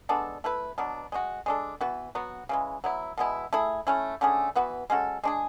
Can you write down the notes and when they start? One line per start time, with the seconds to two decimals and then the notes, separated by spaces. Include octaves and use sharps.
0.09 G#3 B3 D4 A4
0.44 A3 E4 B4
0.78 B2 F#3 B3 D4
1.12 G#3 D4 F#4
1.46 G#3 D4 A4
1.81 E3 B3 F#4 B4
2.15 F#3 B3 F#4
2.49 C#3 E3 G#3
2.84 F#3 B3 E4
3.18 B2 G#3 B3 E4
3.53 A3 E4 G#4
3.87 A3 C#4 E4
4.21 D3 A3 C#4 G#4
4.56 E3 B3 F#4 B4
4.90 G#3 C#4 F#4 A4
5.23 G#3 D4 G#4